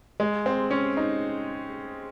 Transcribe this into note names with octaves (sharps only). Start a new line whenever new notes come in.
G#3
C4
C#4
D#4